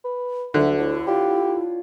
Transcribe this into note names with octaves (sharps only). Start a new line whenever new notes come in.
B4
D2 D3 F#4 E5
D4 E4 C#5
F4 G4